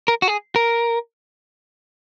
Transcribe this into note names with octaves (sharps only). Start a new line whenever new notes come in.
A#4
F#4
G#4
A#4